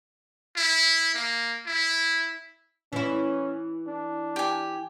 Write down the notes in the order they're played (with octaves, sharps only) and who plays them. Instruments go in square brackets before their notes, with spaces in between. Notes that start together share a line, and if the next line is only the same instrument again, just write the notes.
[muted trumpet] E4
A#3
E4
[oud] E3 E4 [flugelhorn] C#4
[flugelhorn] D4
[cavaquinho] G4 G#5